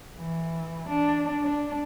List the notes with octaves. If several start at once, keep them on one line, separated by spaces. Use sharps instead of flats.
E3
D4
D4